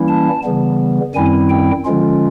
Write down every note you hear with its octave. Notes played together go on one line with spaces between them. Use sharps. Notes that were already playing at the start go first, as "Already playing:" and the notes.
Already playing: E3 G3 A#3 C#4 E4
A5
C#3 E3 G3 B3
F#2 D#3 G3 C4 E4 G#5
G5
D3 F3 G#3 C#4 F4